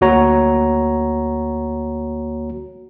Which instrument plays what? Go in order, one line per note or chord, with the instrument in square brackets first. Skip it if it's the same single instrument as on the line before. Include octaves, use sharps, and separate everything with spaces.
[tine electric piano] D2 A#3 F#4 C#5 A#5